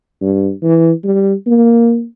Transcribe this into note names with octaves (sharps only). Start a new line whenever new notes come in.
G2
E3
G3
A#3